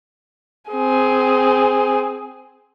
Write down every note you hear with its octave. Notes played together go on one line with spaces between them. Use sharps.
C4 G#4